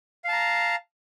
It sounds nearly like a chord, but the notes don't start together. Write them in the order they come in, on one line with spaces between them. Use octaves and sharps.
F5 A5 A#5